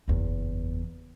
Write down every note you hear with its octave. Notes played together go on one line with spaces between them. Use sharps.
F#1 E2